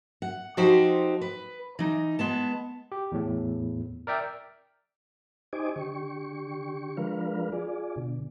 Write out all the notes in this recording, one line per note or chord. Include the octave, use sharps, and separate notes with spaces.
F#5
F3 D#4 F#4 G4 C5
B4
E3 D#4
G#3 B3 A5
G4
E2 A2
A#4 D5 E5 G5
D#4 G4 C5 D#5 G#5 D6
D3 G4 C#6
F3 G#3 D4 A#4 B4 F5
F4 G#4 D5
B2 D3